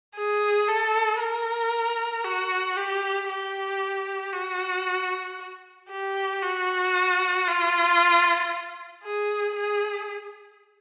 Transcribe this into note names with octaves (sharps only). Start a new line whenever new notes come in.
G#4
A4
A#4
F#4
G4
G4
F#4
G4
F#4
F4
G#4
G#4